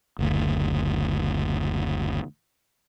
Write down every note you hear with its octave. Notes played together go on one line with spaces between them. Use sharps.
F#1 D2